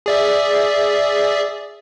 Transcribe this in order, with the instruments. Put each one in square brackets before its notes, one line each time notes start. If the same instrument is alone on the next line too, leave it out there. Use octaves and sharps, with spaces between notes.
[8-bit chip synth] G#4 D5 E5